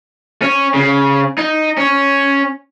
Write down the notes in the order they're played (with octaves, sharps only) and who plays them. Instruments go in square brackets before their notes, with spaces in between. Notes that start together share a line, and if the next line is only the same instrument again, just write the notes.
[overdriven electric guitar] C#4
C#3
D#4
C#4